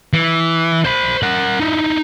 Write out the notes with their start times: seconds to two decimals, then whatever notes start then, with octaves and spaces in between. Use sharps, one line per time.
0.13 E3
0.85 C5 B5
1.23 A#4 F#5
1.60 D#4 E4